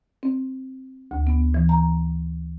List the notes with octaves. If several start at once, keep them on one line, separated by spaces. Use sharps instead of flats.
C4
D2
B3
E3
A#5